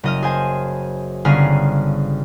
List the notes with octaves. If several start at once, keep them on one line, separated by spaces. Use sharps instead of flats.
F#1 D#5 F6
G#4 C5 G#5
G1 C#3 C#4 G#4 F6 C7